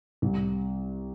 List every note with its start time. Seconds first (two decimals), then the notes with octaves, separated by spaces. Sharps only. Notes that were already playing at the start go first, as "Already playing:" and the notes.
0.22 C2